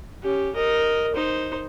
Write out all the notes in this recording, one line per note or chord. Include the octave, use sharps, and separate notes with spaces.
C#4 G4
A#4 D#5
D#4 C5